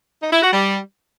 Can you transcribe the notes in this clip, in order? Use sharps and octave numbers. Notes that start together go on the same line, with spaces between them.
D#4
E4
F#4
G3